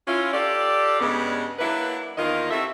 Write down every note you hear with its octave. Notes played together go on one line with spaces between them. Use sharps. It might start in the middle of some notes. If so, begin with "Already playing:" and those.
C#4 E4 F4
F4 G4 A4 D5
G2 C#3 G#3 B3
F#3 A#3 D4 E4 B4
E2 D#3 A#3 F4 A#4 D#5
G3 C4 E4 F#4 A4 E5